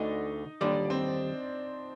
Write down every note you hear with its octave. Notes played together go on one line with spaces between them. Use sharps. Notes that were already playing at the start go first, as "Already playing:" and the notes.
Already playing: D2 D3 A3 D#4 D#5
D#2 D3 G3 D4 D5
C4 C5